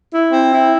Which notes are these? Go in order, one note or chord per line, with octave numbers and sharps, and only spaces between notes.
E4
C4
E4